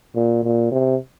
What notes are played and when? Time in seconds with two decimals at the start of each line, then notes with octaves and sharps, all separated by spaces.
0.15 A#2
0.43 A#2
0.72 C3